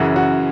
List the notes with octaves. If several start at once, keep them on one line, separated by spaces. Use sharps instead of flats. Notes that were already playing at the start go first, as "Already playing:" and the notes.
Already playing: F#2 C#3 E3 F#4
F#4